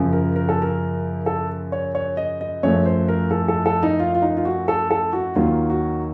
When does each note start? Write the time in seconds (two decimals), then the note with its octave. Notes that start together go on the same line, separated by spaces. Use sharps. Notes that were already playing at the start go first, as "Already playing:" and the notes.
Already playing: F#2 C#3 F3
0.13 A#4
0.36 A#4
0.49 A4
0.62 A#4
1.26 A4
1.72 C#5
1.95 C#5
2.17 D#5
2.41 D#5
2.63 F#2 F3 A3 C#5
2.86 C5
3.08 A#4
3.31 A4
3.48 A4
3.66 A4
3.83 D#4
3.99 F4
4.15 F4
4.22 D#4
4.37 F4
4.45 F#4
4.68 A4
4.91 A4
5.13 F#4
5.35 D#2 D#3 F#3 A#3 F4
5.70 F#4